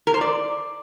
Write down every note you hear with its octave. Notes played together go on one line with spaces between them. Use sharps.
A#4
C5
D5